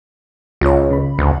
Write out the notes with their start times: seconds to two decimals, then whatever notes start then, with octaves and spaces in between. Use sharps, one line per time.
0.61 C#2 F4 C#5
0.91 C#3 B5
1.19 D2